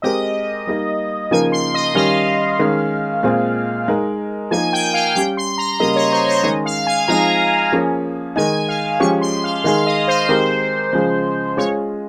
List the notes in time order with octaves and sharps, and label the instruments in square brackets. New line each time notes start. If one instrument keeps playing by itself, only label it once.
[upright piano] G#3 C4 G4 A#4 [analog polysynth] D#5
[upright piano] G3 A#3 D#4
[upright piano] C#3 F3 A#3 D#4 A#4 [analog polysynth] G#5
[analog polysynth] C6
D#5
[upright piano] D#3 G3 C#4 [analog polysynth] F5
[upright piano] D#3 G#3 C#4
A#2 G#3 C4 F4 G#4
G#3 D#4 A#4
[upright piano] F3 A#3 D#4 A#4 [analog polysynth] G#5
[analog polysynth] G5
F5
[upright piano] G3 C#4 G4 [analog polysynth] G5
[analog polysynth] C6
A#5
[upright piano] C#3 G3 A#3 [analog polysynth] D#5
[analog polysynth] C#5
C5
C#5
[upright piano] D#3 G#3 C#4 G#4 [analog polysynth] D#5
[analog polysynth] F5
G#5
[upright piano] F3 G#3 C4 D#4 G#4 [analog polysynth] A#5
[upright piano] F3 A#3 C#4 G#4
[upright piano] D#3 G#3 D#4 [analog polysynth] G#5
[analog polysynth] F5
[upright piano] F3 G#3 C#4 G4 [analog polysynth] C#6
[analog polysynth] C6
F5
[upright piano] D#3 G#3 D#4 G#4 [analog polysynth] F5
[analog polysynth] D#5
C5
[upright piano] D#3 G#3 C4 G4 A#4
C#3 F3 G#3
[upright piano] G#3 C#4 F4 G#4 [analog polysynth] C#5